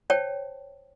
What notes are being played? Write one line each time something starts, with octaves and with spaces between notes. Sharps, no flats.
C5 C#5 G5 A5